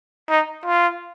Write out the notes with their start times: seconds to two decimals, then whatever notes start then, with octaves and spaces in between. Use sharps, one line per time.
0.29 D#4
0.66 F4